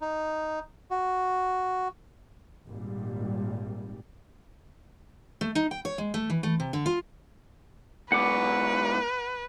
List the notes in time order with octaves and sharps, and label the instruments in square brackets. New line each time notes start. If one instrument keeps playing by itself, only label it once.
[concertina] D#4
F#4
[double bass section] G#1 A#2 G3
[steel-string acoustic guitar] A3
D#4
G5
C#5
G#3
A3
E3
A3
C3
D3
F4
[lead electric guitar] G#2 B2 [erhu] B4 [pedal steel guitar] F#5 D6